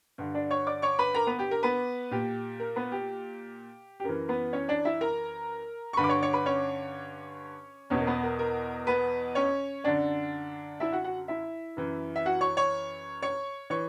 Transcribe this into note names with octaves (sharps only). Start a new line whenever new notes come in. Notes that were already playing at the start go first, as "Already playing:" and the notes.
G2 D3
D4 D5
C#5 C#6
D5 D6
C#5 C#6
B4 B5
A#4 A#5
B3 B4
G4
A#4
B3 B4
A#2 G4
A#4
B3 B4
G4
G4
F#2 E3 A#4
B3 B4
C#4 C#5
D4 D5
E4 E5
A#4 A#5
C#6
G2 D3 B4 B5
D6
C#5 C#6
C#5 C#6
B4 B5
C#4 C#5
E2 B2 C#4 C#5
A#4
B3 B4
A#4
A#4
B3 B4
C#4 C#5
F#2 D3 D4 D5
E4 E5
F#4 F#5
F#4 F#5
E4 E5
F#2 E3
E5
F#4 F#5
C#5 C#6
C#5 C#6
C#5 C#6
E3 C#5 C#6